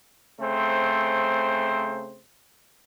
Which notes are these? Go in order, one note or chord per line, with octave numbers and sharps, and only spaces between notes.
C#3 A3 C4 C5